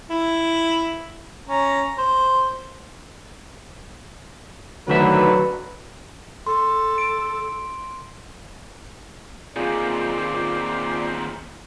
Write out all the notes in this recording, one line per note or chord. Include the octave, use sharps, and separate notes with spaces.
E4
C#4 A#5
C5
A1 D2 D3 D#3 F#3 F#4 B4 E5
A4 C6
D7
D#2 A#2 C4 F4 G#4 D5